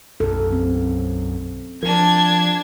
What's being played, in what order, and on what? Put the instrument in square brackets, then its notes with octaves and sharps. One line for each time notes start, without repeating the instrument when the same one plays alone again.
[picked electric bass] B1 F#2 [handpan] A4
[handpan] C4
[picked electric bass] F3 [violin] D4 G#6 [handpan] A#4